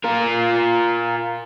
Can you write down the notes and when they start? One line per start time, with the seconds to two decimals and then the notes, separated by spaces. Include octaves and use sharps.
0.04 F4 A#4